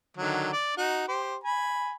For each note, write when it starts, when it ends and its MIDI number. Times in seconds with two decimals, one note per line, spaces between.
0.17 0.51 50
0.17 0.51 51
0.17 0.51 54
0.53 0.73 74
0.77 1.04 63
0.77 1.04 66
1.08 1.36 67
1.08 1.36 72
1.44 1.94 80
1.44 1.94 83